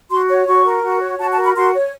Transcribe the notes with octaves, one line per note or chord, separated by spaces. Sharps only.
F#4 C6
C#5
F#4 C#6
A#4
F#4
C#5
F#4 A5
A5
A#4
B5
F#4 C6
C#5